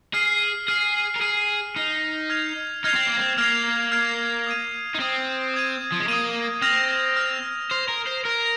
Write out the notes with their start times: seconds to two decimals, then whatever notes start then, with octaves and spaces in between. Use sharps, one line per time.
0.14 G#4 F6 C7 D#7
0.68 G#4 F6 C7 D#7
1.16 A#4
1.21 G#4 F6 C7 D#7
1.75 D#4 F6 C7 D#7
2.30 F6 G#6 C7 F7
2.84 D#4 F6 G#6 C7 F7
2.95 C4
3.07 A#3
3.17 C4
3.38 A#3 F6 G#6 C7 F7
3.92 F6 G#6 C7 F7
4.47 D#6 G#6 D#7
4.95 D#4
5.00 C4 D#6 G#6 D#7
5.54 D#6 G#6 D#7
5.92 F3
6.00 G#3
6.08 A#3 D#6 G#6 D#7
6.62 C4 F6 A#6 F7
7.16 F6 A#6 F7
7.70 C5 F6 A#6 F7
7.88 A#4
8.07 C5
8.25 A#4 F6 A#6 F7